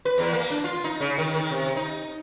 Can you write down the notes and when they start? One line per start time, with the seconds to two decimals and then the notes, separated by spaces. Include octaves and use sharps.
0.05 B4
0.18 E2
0.33 A#3
0.50 D4
0.64 F4
0.84 D#4
1.01 C#3
1.18 D#3
1.34 D#3
1.51 C3
1.76 D#4